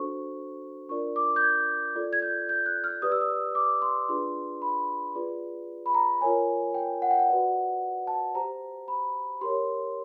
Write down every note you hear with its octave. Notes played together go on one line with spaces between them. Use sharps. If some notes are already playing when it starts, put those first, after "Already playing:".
Already playing: D4 F#4 A4 C5 C#6
D4 F4 A#4 D5 C#6
D6
G6
G#6
F4 A4 D5
G#6
G6
G6
F#6
F6
G4 B4 D5 D#6
E6
D#6
D6
C6
D4 F4 G#4 B4 D5 C6
B5
F4 G#4 B4 D5
B5
A#5
F4 A#4 C#5 G#5
G5
F#5
G5
F#5
F#4 B4 D5
A5
G4 C5 A#5
B5
G4 A#4 C#5 C6